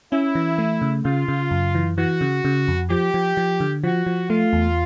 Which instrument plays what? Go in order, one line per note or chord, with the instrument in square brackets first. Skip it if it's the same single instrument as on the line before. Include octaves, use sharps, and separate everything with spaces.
[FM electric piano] C#4 [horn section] E4
[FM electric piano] E3
A3
C#3
[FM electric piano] C#3 [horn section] F4
[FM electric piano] C#3
F#2
E3
[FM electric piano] E3 [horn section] F#4
[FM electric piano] C#3
C#3
F2
[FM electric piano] F3 [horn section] G4
[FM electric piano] F3
F3
D3
[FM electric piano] F3 [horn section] F#4
[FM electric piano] F3
[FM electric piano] A3 [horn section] F4
[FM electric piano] E2